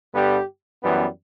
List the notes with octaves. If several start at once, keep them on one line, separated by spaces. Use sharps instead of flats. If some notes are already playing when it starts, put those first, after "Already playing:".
G2 D3 G3 B3 G4
F#2 E3 G3 B3